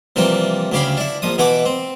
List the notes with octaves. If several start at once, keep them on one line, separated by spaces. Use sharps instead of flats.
C3 E3 F3 G3 A#3
D2 C#3 G4 F5 B5
D4 E4
A#1 F3 D#6
B2 E3 E4 F#5 B5 D6
C4